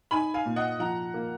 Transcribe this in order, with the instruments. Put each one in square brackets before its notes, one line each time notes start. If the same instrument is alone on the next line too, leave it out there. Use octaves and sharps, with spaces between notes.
[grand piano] D#4 [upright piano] G#5 B5
[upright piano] F5 G#5
[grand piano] A#2
[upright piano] D#5 F#5
[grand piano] F3 [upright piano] F#5 A#5
[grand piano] A#3